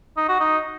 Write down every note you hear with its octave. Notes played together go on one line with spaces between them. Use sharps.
D#4
F#4
D#4